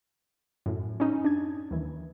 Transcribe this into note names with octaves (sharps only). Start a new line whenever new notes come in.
F#2 A2
C#4 D#4
D4 G#6
D#2 E3